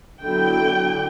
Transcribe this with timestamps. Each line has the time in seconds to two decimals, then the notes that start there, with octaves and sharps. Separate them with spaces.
0.21 D3 F#3 B3 E4 G5
0.78 D3